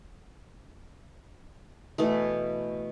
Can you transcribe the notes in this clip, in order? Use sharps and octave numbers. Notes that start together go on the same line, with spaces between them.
B2 E3 A3